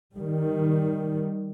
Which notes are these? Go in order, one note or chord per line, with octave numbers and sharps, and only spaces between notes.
D#3 G3